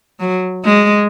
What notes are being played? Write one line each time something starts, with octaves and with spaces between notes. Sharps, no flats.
F#3
G#3